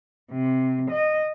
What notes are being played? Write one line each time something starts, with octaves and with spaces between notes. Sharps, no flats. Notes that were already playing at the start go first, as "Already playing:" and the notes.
C3
D#5